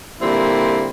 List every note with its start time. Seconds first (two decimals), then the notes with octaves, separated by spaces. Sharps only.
0.21 A#2 D3 G3 C4 E4